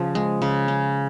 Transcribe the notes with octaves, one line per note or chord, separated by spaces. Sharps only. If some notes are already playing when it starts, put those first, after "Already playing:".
Already playing: C#3 F3
G#3
C#3
C#4